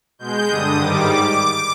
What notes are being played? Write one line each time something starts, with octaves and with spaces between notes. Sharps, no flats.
B2 G#3 G6
G2 D3 G3 D#6
G#2 D#3 G3 D6
G3 D6